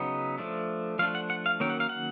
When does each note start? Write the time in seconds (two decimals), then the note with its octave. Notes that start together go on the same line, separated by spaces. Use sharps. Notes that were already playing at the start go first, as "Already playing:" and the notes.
Already playing: C#3 F#3 B3 D#4
0.38 F3 A3 D4
0.99 F3 A3 D4 F5
1.15 F#5
1.30 F#5
1.46 F5
1.60 D#3 F#3 A#3 C#4 G5
1.70 F#5
1.80 F5
1.89 F#5